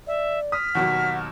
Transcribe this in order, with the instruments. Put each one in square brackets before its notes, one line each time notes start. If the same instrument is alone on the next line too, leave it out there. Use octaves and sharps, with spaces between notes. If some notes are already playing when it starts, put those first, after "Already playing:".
[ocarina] D5 [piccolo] E5
[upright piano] D#6 [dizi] F6 [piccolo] B6
[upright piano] D#2 B2 F#3 [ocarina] F#5